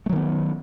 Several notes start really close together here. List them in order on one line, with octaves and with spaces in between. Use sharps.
A3 F#3 D#3 B3